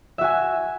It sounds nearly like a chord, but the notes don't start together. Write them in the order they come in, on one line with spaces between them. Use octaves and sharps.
E5 F#4 G#5